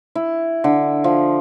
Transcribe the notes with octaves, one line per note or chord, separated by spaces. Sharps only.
E4
D3
F3